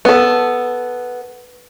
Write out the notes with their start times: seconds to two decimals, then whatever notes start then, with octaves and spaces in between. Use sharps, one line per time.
0.05 B3 A4